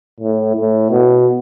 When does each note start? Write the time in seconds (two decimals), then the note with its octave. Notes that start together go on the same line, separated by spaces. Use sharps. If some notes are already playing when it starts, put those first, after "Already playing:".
0.20 A2
0.56 A2
0.91 B2